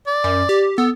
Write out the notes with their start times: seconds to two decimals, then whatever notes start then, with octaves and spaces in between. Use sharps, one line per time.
0.07 D5
0.24 F#2
0.49 G4
0.78 B3 A4